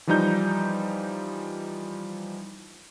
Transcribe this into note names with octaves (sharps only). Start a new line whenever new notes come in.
E3 F3 G3 D#4 A#5 G6